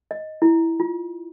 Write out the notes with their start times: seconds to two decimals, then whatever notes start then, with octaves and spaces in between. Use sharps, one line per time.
0.11 D#5
0.42 E4
0.80 F4